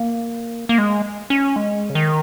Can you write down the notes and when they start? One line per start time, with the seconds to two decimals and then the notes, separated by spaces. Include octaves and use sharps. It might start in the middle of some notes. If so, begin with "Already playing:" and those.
Already playing: A#3
0.69 A#3
0.78 G#3
1.30 C#4
1.56 G#3
1.90 C#3
1.95 D#3